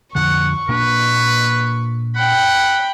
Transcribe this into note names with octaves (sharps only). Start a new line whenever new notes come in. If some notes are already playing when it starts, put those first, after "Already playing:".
F2 D3 F3 F#5 C#6
A#2 A#3 D4 B4
F#5 G5 B5